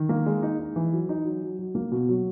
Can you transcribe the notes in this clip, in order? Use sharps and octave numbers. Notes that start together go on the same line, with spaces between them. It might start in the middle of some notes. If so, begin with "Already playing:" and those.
Already playing: D#3
A#3
G#3
D#4
D#4
E3
F#3
D#4
F#3
F#3
F#3
A#3
B2
F#3